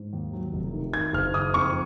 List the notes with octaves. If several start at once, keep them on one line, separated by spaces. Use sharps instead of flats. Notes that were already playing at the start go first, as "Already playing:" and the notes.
Already playing: G#2
D#2
F#3
F1
D#3
D#3 G#6
F#1 F6
D#3 D#6
F2 C#6